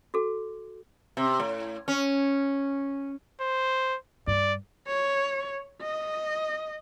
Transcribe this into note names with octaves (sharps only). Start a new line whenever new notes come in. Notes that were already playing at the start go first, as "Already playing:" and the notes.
F#4 A4
C3
A2
C#4
C5
G2 D5
C#5
D#5